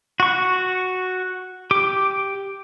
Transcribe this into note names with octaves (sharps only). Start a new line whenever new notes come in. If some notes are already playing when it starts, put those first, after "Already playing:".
F#4 C#6
G4 D6